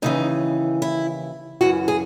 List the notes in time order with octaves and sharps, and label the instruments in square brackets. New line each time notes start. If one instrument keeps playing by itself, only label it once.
[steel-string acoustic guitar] D#2 C#3 E3 D#4
E4
F#2 C#3 E3 F#4
G#4